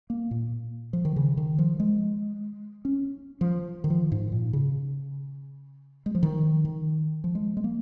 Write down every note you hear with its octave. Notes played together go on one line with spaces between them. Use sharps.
A#3
A#2
F3
D#3
C#3
D#3
F3
G#3
C#4
F3
D#3
F3
G#2
A#2
C#3
G#3
F3
D#3
D#3
F3
G#3
G#3
A#3